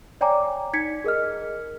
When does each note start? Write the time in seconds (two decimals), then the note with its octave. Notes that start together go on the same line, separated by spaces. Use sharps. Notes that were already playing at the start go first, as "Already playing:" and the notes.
0.21 C#5 D5 G5 G#5 A#5 D6
0.73 D#4 G#6 B6 C#7
1.04 G#4 A#4 D#5 F6